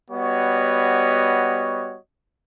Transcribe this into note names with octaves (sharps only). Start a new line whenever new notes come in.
G3 B3 F#4 C#5 D#5